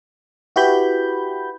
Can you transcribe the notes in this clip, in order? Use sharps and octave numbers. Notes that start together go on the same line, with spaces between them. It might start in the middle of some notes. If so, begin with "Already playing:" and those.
E4 F#4 G4 B4 B5 G6